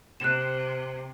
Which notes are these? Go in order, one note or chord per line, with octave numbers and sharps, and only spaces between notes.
C3 F#6 E7